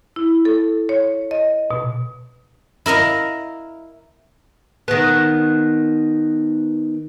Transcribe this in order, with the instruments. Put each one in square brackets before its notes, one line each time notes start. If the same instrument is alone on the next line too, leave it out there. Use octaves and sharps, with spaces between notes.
[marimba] E4
A4
C#5
D#5
B2
[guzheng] E4 A#4 D#5 F5
[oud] D#3 B3